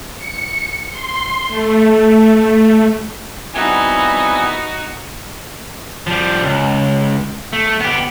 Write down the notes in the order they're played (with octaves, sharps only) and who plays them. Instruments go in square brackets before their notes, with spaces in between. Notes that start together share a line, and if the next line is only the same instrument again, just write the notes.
[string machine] C#7
C6
A3
[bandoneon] G3 C4 E4 [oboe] B3 [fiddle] D#4 F#4 [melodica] G#5
[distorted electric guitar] F3 G3
C#2
A3
B3 G4